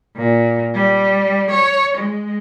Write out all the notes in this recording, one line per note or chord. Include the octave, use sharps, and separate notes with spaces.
A#2
G3
C#5
G#3